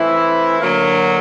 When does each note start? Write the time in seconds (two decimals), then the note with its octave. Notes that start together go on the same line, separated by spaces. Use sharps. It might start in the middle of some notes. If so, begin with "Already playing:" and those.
Already playing: E3 A3 C4 E4
0.61 D3 F#3 A#3